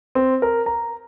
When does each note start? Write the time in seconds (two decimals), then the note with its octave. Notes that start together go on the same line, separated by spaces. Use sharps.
0.15 C4
0.42 A#4
0.66 A#5